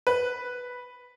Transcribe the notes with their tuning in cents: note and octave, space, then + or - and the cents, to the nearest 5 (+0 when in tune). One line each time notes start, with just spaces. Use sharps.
B4 -5